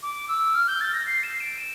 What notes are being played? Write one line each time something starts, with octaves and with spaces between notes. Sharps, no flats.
D6
E6
F6
G6
A6
A#6
C7
E7
D7
E7